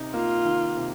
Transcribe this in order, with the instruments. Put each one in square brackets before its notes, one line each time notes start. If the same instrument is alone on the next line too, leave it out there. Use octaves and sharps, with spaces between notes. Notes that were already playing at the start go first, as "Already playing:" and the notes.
Already playing: [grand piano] C3 D#4
[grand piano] A#3 [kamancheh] F4
[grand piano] D#3
C3